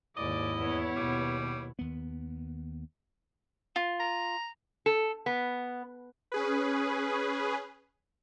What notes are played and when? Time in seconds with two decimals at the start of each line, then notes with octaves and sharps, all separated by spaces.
0.17 D#2 G#2 E4 D5 D#5 D6
0.57 E2 B3 C#5
0.96 D#2 B2 G3
1.79 D#2 B3
3.76 F4
3.99 A#5
4.86 A4
5.26 B3
6.32 C#4 G#4 B4